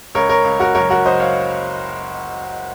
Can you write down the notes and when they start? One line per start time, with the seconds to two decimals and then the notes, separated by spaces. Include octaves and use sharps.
0.15 C#2 A#4 C#5
0.29 A#4 C#5
0.44 C#2
0.60 F#4 A#4
0.75 F#1 A#4 C#5
0.90 F#4 A#4
1.05 F#1 C5 D#5
1.20 C#5 F5